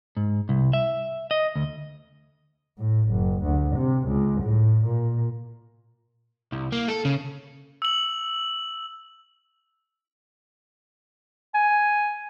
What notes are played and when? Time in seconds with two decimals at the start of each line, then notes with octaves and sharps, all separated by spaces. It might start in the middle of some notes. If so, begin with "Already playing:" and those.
0.17 G#2
0.49 C2
0.73 E5
1.31 D#5
1.56 D2
2.79 A2
3.09 F#1
3.43 D2
3.76 C3
4.08 C#2
4.42 A2
4.86 A#2
6.52 C2
6.72 A#3
6.88 A4
7.05 C#3
7.82 E6 F#7
11.55 G#5